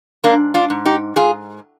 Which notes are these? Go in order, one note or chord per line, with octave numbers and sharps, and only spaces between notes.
G#2 A#3 D4
D4 F4
G#2
D#4 G4
G#2 F4 G#4